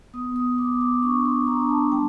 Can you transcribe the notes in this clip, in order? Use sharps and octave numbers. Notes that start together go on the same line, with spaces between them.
B3 D#6
D#6
B3 D6
D6
D4 C#6
C6
D4 A#5
A5
G3 G5